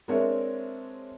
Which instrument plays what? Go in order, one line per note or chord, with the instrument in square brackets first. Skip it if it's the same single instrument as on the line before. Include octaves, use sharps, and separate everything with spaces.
[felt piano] G#3 C4 D4 A#4 C#5 E5